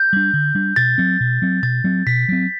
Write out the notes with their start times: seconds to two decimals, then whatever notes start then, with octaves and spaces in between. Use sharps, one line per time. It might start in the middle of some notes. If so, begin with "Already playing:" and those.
Already playing: G6
0.13 G3 D4
0.33 D3
0.55 G3 D4
0.76 B2 A6
0.98 F#3 C4
1.20 B2
1.42 F#3 C4
1.63 B2 A6
1.84 F#3 C4
2.07 B2 B6
2.29 F#3 C4